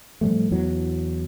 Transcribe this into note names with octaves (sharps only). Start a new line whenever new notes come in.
A2 F3 G3 A3
E2 E3 F#3